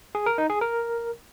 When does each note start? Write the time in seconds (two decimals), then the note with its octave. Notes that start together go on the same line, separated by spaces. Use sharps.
0.15 G#4
0.26 A#4
0.38 D#4
0.50 G#4
0.61 A#4